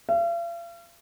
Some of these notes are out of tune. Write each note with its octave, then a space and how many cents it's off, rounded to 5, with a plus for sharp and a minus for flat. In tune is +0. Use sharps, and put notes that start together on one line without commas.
F5 -45